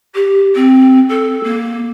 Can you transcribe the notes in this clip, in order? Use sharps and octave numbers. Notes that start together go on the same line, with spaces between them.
G4
C4
A4
A#3